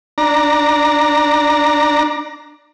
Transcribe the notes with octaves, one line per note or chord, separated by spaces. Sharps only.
D4 A#5